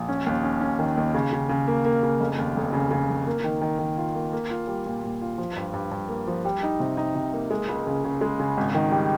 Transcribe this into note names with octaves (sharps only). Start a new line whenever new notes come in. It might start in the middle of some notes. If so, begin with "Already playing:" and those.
Already playing: A#1
C#4
D#2
C#4
C#4
D#3
D#2
C#3
C#3
C#3
A#3
A#3
C#3
F1
D#2
F1
C#3
C#3
F1
A#3
D#3
D#3
D#3
F4
A#3
A#3
F4
G3
A#2
A#2
F4
F3
G2
G2
G2
A#3
F3
G3
D#4
C3
D#4
C3
A#3
G#3
C#2
C#3
C#3
G#3
C#3
G#1
D#3
G3